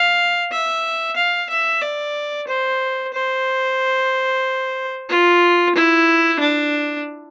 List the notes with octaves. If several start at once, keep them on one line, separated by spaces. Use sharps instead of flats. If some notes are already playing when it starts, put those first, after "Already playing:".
Already playing: F5
E5
F5
E5
D5
C5
C5
F4
E4
D4